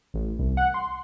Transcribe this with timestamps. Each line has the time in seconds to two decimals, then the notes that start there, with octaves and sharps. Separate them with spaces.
0.14 A1
0.39 C2
0.57 F#5
0.74 C6